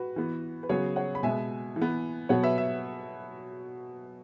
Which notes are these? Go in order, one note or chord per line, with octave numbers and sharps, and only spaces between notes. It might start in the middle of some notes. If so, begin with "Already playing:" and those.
Already playing: F#4 B4
E3 B3
B4
C#3 F#3 B3 G#4 C#5
C#5 F#5
B5
B2 G#3 B3 E5 G#5
E3
B3
B2 F#3 B3 C#5 F#5
B4 E5
E5